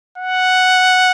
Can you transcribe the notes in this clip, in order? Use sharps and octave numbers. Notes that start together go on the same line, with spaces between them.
F#5